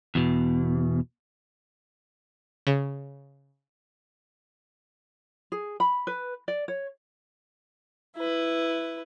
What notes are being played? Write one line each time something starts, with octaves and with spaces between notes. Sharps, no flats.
E2 B2
C#3
G#4
B5
B4
D5
C#5
E4 B4